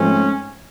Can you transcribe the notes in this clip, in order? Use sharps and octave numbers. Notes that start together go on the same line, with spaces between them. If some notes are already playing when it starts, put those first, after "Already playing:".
Already playing: G#2 F3 A3 C4 C#4